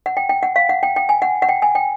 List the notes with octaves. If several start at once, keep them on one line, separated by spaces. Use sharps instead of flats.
F#5
G5
G5
F#5
F5
F#5
G5
G5
G#5
F#5
F#5
G5
G#5
G5